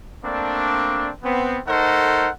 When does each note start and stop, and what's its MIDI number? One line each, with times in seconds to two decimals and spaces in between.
0.25 1.11 57
0.25 1.11 58
0.25 1.11 60
0.25 1.11 62
1.23 1.58 59
1.23 1.58 60
1.67 2.28 57
1.67 2.28 63
1.67 2.28 69
1.67 2.28 70
1.67 2.28 72
1.67 2.28 78